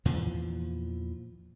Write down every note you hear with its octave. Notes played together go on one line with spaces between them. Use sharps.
E2 A#2 E3 F3